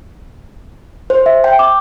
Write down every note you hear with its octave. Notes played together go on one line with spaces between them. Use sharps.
C5
E5
G5
D6